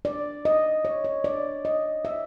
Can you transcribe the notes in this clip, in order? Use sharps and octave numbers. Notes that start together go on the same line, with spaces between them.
D5
D#5
C#5
C#5
D5
D#5
E5